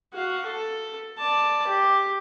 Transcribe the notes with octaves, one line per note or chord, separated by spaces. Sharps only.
F#4 F5
A4
D5 A5
G4